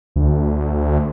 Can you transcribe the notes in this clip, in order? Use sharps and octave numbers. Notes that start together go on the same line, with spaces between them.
D2